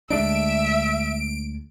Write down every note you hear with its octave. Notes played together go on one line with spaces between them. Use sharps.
D2 G#3 D4 E5 D7